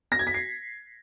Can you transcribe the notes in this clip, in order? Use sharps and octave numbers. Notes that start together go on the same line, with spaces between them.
A#6
G#6
B6
C7